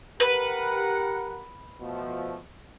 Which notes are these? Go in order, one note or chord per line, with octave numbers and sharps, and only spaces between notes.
G4 A#4 B4 F#5
B2 F3 A3